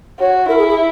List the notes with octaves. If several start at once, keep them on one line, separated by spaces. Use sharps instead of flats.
F#4 C#5
E4 A#4
G#4
G#4